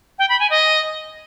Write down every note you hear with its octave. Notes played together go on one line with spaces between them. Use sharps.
G5
B5
G#5
D#5